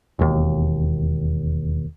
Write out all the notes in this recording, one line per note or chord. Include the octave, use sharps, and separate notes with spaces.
E1 D#2